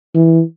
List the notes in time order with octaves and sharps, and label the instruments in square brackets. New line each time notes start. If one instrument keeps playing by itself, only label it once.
[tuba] E3